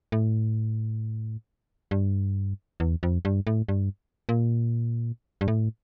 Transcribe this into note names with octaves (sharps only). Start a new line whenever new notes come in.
A2
G2
E2
F2
G2
A2
G2
A#2
G2
A2